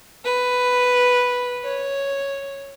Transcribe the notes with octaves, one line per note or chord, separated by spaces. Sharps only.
B4
C#5